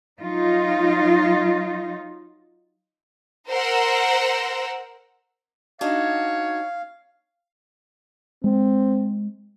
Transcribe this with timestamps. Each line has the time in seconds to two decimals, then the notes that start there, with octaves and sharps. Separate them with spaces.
0.20 F#3 D#4 F4
3.49 A#4 C5 F#5 E6
5.81 D4 D#4 F#4 C#5 F5
8.44 G#3 C4